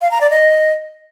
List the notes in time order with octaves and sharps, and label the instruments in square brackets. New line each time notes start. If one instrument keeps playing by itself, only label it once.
[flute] F5
A#5
D5
D#5